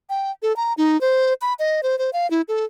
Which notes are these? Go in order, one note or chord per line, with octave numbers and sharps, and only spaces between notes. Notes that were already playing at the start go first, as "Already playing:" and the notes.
G5
A4
A#5
D#4
C5
B5
D#5
C5
C5
F5
E4
A4